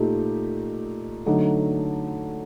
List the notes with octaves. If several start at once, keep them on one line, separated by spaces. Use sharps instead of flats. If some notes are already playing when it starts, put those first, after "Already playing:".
Already playing: A#2 A3 D#4 G4
D3 F#3 A3 D#4